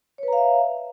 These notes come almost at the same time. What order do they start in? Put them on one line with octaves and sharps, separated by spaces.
C#5 B4 A#5 F5 E5